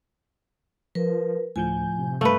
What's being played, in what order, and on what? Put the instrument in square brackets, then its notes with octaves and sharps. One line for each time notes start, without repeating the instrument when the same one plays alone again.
[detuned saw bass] F3 [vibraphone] A#4 B4
[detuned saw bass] D2 [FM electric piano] A2 F3 G6 [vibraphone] G#5
[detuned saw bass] C3
[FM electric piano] G2 F5 [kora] A3 B4